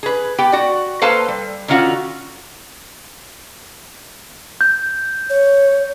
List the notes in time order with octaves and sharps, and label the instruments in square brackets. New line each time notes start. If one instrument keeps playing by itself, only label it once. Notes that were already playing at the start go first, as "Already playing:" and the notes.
[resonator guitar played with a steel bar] G#4 B4
B3 G4 G5
F#4 D5
A#3 A4 B4 C5 F5 A5
G3
D3 D#3 C#4 F4 F#4
[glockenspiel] G6
[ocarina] C#5